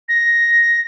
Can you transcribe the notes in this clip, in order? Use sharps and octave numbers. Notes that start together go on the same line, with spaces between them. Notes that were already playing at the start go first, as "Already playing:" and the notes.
A#6